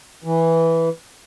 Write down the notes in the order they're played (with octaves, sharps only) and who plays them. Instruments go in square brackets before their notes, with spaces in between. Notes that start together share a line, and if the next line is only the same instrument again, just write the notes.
[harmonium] E3